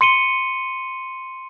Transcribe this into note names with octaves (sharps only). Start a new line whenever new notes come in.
C6 C#7 D#7 G7